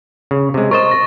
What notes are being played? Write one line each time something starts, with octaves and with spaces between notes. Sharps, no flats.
C#3
C3 G#3
A#4 C5 D#5 C#6 A6 E7
A#6